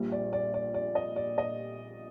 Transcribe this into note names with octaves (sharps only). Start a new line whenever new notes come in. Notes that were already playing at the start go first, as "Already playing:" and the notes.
Already playing: A#1 A#2 G3
D5
D5
D5
D5
D#5
D5
D#5